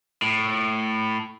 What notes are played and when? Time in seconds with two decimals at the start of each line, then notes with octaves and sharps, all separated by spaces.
0.22 A2